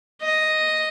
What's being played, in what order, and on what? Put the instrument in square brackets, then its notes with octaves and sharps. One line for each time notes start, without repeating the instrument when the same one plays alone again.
[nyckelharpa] D#5